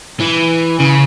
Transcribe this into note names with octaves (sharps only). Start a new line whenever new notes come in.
E3
C#3